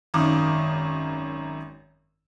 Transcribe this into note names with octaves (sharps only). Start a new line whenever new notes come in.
G#1 F#2 D#3 D6 D#6